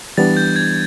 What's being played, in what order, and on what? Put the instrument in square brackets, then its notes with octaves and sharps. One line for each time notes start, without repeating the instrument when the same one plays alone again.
[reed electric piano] E3 G3 B3 D4 [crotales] A6
[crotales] G6
G#6